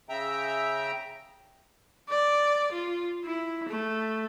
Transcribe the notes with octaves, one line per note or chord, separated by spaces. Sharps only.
C#3 E5 G5 A#5
D5
F4
E4
A3